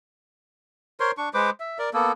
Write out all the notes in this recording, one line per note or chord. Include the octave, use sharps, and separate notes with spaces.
A#4 C5 C#5 C6
D4 C#6
G#3 B4 C5 D6
E5
A#4 D5
A#3 B3 A4